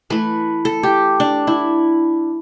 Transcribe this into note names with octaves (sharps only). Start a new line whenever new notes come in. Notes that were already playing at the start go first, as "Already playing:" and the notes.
E3 A3 B4
A4
G4
D4
E4